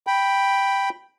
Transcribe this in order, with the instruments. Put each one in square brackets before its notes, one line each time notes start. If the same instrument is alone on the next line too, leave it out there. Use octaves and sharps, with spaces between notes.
[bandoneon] G5 B5